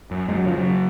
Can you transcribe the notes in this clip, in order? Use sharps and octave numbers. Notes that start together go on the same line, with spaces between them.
F#2
F#2 G#3
F#3
C#3 F3
F#3
C#3